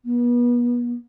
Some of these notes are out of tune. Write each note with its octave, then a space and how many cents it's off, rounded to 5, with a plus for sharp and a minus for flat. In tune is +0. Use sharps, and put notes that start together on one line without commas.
B3 -35